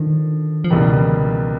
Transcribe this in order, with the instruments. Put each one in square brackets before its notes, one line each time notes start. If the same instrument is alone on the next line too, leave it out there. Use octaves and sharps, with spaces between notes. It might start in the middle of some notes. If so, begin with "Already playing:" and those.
Already playing: [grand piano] D3 F3 [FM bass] D#3
[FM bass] F3
[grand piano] C#2 B2 G3 A#3 [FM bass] E3
[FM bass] C#3
D3
E3